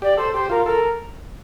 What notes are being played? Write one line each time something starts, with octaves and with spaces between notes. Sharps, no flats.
G4 D5
A4 C5
G4 C5
F4 A#4
A4 A#4